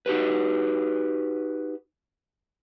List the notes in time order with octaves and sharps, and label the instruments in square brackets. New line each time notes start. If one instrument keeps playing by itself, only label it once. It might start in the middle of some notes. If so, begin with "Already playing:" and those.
[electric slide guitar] D#4 F#4 G4 B4